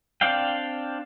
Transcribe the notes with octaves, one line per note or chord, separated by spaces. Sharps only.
C4 D4 D5 F5 G5